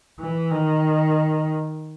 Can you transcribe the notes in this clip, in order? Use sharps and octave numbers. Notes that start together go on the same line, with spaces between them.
E3
D#3